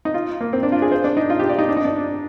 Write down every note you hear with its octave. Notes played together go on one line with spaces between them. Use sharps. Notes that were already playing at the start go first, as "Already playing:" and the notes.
D#4
F4
A#3
C4
D4
F4
G#4
C5
D4
D#4
F4
G4
D5
D#4
D4
D#4
D4